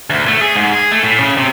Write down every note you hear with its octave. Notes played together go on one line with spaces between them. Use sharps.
D2
A3
G#4
G#2
G#4
A3
A2
C#3
C3